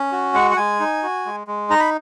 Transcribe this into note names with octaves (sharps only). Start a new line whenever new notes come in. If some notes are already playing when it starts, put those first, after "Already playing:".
Already playing: C#4
F#4
G#3 F#5
F#5
G#3 G#5
D#4
F#4
G#3
G#3
D#4 A#5
B5